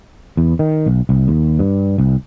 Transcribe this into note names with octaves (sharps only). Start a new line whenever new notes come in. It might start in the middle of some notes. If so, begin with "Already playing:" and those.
E2
D#3
B1
C2
D#2
G2
C2